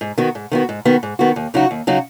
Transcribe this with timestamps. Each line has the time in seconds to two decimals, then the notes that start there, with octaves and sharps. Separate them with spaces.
0.01 G#2
0.18 D#3 B3 F#4
0.35 G#2
0.52 D#3 B3 F#4
0.69 G#2
0.85 D#3 B3 F#4
1.03 G#2
1.19 D#3 B3 F#4
1.36 D#2
1.54 C#3 F#3 D#4 F#4
1.71 D#2
1.87 C#3 F#3 D#4 F#4